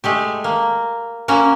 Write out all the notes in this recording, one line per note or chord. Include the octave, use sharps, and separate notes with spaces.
G#3 A3 G4
A#3
A#3 C#4 F#4